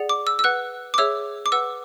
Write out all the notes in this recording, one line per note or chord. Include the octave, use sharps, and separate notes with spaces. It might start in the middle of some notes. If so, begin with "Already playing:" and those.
Already playing: G#4 D5 F#5
D6
E6
E6
B4 F#5 F#6
D6
G#4 C#5 E5 E6
D6
B4 F#5 E6